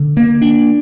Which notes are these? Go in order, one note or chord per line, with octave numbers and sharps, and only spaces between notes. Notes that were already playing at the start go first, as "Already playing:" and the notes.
Already playing: D3
A#3
D4